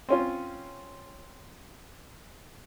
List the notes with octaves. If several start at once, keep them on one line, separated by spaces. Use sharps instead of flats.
C4 C#4 F4